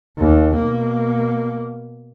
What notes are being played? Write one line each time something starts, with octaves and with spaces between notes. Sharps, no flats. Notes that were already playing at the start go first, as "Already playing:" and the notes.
D#2
B2 A#3